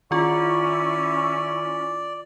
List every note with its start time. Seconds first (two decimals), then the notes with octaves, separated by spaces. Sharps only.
0.11 D#3 C#4 E4 F4 D5 C#6